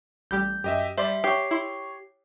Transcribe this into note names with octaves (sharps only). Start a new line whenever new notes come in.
A1 G3 G4 G6
F#2 G4 D#5 E5
G3 C5 D5 E5 C6
G4 C#5 C#6 C7
E4 C6